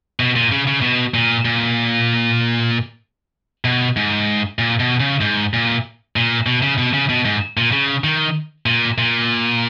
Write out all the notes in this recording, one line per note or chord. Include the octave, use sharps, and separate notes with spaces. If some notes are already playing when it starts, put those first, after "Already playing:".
B2
A#2
C#3
C#3
B2
A#2
A#2
B2
G#2
A#2
B2
C#3
G#2
A#2
A#2
B2
C#3
B2
C#3
B2
G#2
A#2
C#3
D#3
A#2
A#2